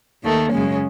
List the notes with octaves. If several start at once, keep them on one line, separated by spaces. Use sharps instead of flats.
D#2 D#3 A3
F#2 C#3 G#3 C#4